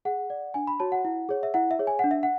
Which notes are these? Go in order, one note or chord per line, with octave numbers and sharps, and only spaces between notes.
G#4 F#5
D5
D4 G#5
B5
F#4 C#5 A5
F#5
E4
G#4 C#5
E5
E4 F#5
E5
G#4 C#5
G#5
D4 F#5
E5
F#5